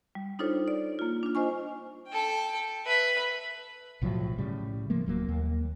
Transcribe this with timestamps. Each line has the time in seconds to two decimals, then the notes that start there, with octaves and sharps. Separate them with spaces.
0.15 G3
0.39 D4 D#4 F4 A4 C5 C#5
0.68 D5
0.99 A#3 F4
1.23 D4 F4
1.35 F4 C5 D#5 G#5 C#6
2.08 A4 G5
2.86 B4 E5
4.02 B1 A2 F3 F#3
4.38 A2 C#3 G3
4.90 F3 G3 A3 A#3
5.06 D#1 F#3 A#3
5.28 D#2 A#3